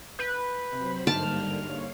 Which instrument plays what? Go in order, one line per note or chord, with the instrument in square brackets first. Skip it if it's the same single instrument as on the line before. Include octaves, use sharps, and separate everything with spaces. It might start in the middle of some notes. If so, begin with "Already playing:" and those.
[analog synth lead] B4 [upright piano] G6
[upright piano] C3 [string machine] F#3 C5 B5
[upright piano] G1 G#2 D7 [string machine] D3 G3 A#3 [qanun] A5 [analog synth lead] F6
[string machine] C#5 F5